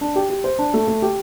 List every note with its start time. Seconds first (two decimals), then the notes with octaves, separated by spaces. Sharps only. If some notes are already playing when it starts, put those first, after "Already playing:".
0.01 D4
0.16 G4
0.30 G4
0.44 C5
0.59 D4
0.74 A3
0.87 A3
1.02 G4